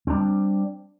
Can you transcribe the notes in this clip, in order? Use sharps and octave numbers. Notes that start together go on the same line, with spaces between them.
G3 C4 D4